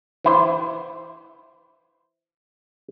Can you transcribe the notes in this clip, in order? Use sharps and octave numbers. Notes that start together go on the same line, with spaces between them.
E3 E4 C5